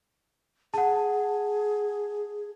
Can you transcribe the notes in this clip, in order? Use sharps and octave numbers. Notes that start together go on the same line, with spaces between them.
G#4 F#5 A5